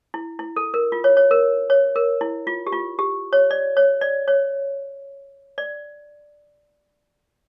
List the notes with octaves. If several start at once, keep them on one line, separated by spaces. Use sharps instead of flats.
E4
E4
A4
A#4
F4
C#5
C#5
A#4
C#5
A#4
E4
F4
G4
F4
G4
C#5
D5
C#5
D5
C#5
D5